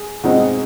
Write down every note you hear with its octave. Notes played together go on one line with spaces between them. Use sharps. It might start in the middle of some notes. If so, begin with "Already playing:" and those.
Already playing: G#4
B2 G#3 C4 D#4 F#4